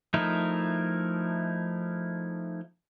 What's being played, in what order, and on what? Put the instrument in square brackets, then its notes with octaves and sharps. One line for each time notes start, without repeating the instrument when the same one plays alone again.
[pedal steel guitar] F3 A3 D#4 E4 A#4